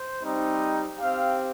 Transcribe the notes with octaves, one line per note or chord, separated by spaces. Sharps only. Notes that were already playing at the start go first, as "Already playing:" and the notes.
Already playing: C5
G3 C4 D#4
C4 G4 F5